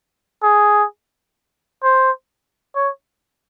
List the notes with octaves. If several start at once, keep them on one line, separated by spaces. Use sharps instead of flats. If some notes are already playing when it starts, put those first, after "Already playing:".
G#4
C5
C#5